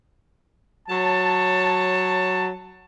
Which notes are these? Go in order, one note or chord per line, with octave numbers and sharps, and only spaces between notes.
F#3 C#5 A5